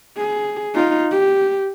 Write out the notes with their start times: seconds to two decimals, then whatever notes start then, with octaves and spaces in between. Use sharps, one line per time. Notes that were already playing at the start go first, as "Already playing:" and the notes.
0.17 G#4
0.74 D#4 F4
1.11 G4